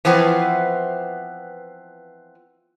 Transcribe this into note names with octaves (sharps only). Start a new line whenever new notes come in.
E3 F3 B3 C4